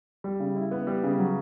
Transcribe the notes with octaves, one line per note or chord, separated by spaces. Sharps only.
G3
C#3
E4
B3
G3
C#3
F#3